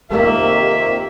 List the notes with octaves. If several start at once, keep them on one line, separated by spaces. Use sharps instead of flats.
F2 C3 D#3 A#3 G4 E5